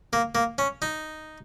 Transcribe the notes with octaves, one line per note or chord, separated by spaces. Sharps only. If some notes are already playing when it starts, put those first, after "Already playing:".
A#3
A#3
C#4
D#4